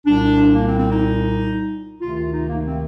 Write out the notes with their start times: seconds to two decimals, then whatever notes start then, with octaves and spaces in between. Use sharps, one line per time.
0.06 C2 A#2 G3 D4
0.54 A#3
0.66 C4
0.79 C4
0.90 D#4
1.99 D2 C3 D#3 F4
2.15 F4
2.32 D#4
2.48 A#3
2.64 C4